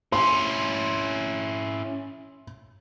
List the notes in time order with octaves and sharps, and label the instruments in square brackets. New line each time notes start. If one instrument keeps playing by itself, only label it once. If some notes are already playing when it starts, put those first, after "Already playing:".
[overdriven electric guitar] C#4 E4 [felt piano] C6